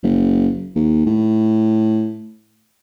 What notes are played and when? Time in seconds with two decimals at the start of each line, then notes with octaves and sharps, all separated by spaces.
0.03 F#1
0.75 D#2
1.06 A2